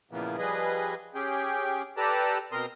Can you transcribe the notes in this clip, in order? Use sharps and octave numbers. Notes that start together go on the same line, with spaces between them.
A#2 C#3 E3 F3 A#3 B3
F3 G3 G#4 B4 D#5
C#4 G4 G#4 G5
G4 A4 B4 D5 A5 A#5
B2 C4 A#4 A#5 C6 D#6